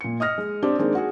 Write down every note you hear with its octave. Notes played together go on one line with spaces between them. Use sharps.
A#2 C#7
D#5 D#6 F6 A#6
G#3
C4 D4 G4
D#3 G#3 A#3 C4 D4
F#4 G#4